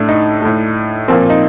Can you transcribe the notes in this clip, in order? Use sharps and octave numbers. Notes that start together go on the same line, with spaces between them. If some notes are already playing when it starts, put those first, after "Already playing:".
Already playing: A2 A3 D4
D#4
A2 A3
A#2 F3 A#3 C4
D#4